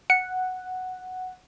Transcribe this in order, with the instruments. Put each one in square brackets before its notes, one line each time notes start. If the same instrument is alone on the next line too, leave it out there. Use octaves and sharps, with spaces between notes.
[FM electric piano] F#5 [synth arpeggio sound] C#7